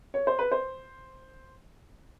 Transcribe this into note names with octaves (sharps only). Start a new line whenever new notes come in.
C#5
C5
B4
C5